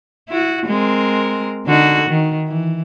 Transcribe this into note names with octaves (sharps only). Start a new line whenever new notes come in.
E4 F#4
G#3 C4 A#4
D3 D#4 F#4
D#3
E3